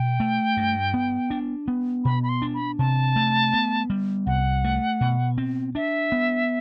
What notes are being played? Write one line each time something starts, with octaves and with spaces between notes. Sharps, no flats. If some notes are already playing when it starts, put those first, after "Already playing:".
Already playing: B2 G5
A3
G2
B3
D4
B3
B2 B5
B5
C6
D4
B5
C3 A5
A3
B3
G3
C2 F#5
A3
B2
C4
D4 E5
B3